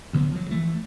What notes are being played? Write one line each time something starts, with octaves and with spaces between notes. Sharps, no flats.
D2 D3 F#3 B3
F3 F#3
E3 A3